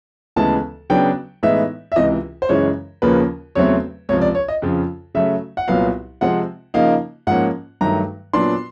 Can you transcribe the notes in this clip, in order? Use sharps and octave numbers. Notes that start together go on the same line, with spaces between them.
D2 C#3 E3 G#3 B3 A5
C#3 F#3 B3 D4 G5
A2 E3 G#3 B3 D#4 E5
E5
C#2 C3 E3 D#5
C5
F#2 C#3 E3 G#3 C#5
D#2 C#3 F3 A#3 C#4 B4
E2 C#3 F#3 A3 C4 C#5
C#2 C3 F3 C#5
D5
C#5
D#5
F2 C#3 F3
C#3 F#3 A3 E5
F#5
C2 A#2 F#3 B3 F5
C3 F3 G#3 C4 F#5
C#3 F3 A#3 D#4 F5
G#2 F3 A#3 C#4 F#5
G2 D#3 F#3 A3 A#5
A#2 F#3 B3 D4 C6